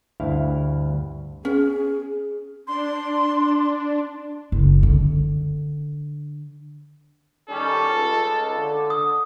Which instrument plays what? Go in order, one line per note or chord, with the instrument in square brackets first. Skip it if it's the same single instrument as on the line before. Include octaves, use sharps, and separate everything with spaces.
[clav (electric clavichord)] D2 G2 E4 F5
[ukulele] C#4 [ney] G#4
[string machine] D4 [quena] C6
[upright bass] F#1
D3
[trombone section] D#3 G3 C#4 [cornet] A4
[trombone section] C#2
D3
[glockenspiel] D#6